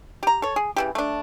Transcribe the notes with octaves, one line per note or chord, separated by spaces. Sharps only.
G4 A#5
A4 C#5
G#4
C#3 E3 G4
A3 D4